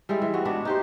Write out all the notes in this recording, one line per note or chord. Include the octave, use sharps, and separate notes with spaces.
G3 G#3 E4 G#4
E3
B3 C4 F#4
G#3 B3 D4 F#4
D#4 G4 C5